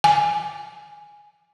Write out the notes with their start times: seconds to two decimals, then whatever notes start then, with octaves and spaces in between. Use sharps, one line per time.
0.04 G#5